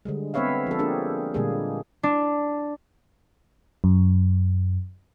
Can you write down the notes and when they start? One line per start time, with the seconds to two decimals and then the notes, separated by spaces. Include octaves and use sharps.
0.05 D3 G3 G#3
0.34 B3 C4 B4 C#5 E5 F5
0.67 F3 A4
0.79 A#3 D4 G4 G#4 A#4
1.34 A#2 D3 G3 G#3 A#3 G#4
2.03 D4
3.84 F#2